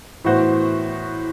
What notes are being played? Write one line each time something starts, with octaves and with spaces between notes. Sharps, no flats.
A2 E3 B3 F#4 C5